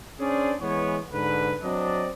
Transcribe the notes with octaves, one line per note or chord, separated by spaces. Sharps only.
C#4 D4 G#4 C5 D5
E3 G#3 B3 C#5
G#2 D3 B4
F#3 C4 D4 D5 D#5